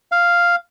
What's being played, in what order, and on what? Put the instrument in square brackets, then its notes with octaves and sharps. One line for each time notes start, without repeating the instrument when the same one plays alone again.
[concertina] F5